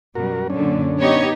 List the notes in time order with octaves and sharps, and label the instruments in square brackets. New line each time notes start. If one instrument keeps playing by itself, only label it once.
[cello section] F#2 B2 G3 [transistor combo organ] F#4 A#4
[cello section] F#2 A#2 D3 [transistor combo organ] C#4 D4
[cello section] B3 D#4 G4 [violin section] C#5 D#5